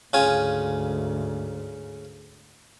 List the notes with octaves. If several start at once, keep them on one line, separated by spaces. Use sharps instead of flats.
D2 G#2 C#3 F4 G#5